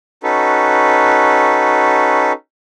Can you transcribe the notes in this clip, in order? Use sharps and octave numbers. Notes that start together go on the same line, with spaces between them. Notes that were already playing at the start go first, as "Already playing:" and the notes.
C#4 D#4 F#4 A4 B4